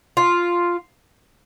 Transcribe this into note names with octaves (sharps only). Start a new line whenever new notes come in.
F4